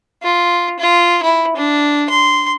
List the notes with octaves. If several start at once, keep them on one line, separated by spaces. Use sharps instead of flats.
F4
F4
E4
D4
C6